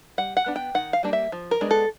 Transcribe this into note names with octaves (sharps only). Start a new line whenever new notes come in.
G3 F#5
F#5
B3 D4
G5
D#3 F#5
F5
G3 A#3 D4
E5
F3
A#4
G#3 B3 D4
A4